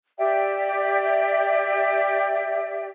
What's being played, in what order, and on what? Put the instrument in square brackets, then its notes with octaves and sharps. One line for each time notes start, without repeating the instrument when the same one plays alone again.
[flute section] G4 D5 E5 G5